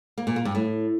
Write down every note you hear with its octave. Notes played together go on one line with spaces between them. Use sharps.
A#3
A#2
A#3
G2
A2